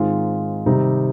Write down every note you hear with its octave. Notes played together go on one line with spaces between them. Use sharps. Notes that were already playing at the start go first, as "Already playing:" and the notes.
Already playing: G#2 D#3 G#3 C4 F4
C3 D#3 G3 C4 D#4